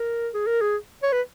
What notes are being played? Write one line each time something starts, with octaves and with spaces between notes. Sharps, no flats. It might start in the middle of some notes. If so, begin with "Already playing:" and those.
Already playing: A#4
G#4
A#4
G#4
C#5
B4